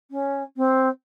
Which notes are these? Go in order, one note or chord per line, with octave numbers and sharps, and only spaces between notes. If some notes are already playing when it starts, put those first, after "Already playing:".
C#4
C4